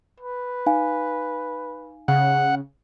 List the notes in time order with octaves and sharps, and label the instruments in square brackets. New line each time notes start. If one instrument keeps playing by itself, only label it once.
[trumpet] B4
[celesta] D#4 F5 G#5
[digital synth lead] C#3 [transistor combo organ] F#5